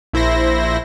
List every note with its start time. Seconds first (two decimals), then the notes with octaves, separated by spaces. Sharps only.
0.13 A#1 E4 C5 A#6